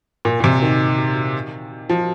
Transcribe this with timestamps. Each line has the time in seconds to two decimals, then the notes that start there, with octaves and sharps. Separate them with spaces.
0.25 A#2
0.40 A#2
0.44 C3
0.62 D#3
1.90 F3